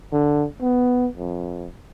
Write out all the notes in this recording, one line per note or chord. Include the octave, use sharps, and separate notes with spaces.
D3
B3
F2